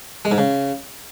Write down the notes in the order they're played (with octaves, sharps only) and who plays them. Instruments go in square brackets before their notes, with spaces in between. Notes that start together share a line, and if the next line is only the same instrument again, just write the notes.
[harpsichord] G#3
G#2
C#3